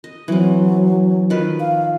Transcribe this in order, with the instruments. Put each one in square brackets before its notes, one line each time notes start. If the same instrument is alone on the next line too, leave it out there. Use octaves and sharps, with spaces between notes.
[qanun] D#5
[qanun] E3 C4 [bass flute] F#3
[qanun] D#3 F3 B4
[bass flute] F5